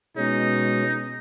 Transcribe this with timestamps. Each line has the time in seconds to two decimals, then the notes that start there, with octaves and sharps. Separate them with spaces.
0.17 B2 G#3 C#4 D#4